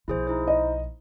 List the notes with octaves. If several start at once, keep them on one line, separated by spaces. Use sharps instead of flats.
B1 F3 E4 G#4 C5
D#4 E4 C5
D#5